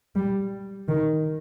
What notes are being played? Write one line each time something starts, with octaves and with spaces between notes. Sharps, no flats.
G3
D#3